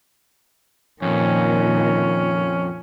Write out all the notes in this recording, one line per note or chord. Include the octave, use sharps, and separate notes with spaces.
F2 A#2 D#3 C#4